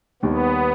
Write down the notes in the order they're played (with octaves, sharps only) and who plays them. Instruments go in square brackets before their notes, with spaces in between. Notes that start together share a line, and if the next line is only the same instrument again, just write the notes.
[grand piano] D#2 D#3 G3 [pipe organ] B3